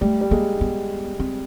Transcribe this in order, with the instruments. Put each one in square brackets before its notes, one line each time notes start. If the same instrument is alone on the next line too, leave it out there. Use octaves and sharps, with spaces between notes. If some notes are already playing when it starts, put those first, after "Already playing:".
[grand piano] G3 [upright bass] A3
[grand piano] G3
[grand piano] G#3 [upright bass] A#3
[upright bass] B3
C4